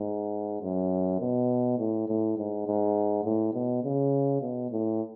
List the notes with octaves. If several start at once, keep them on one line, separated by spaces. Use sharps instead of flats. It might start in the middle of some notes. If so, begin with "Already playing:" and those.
Already playing: G#2
F#2
B2
A2
A2
G#2
G#2
A2
B2
C#3
B2
A2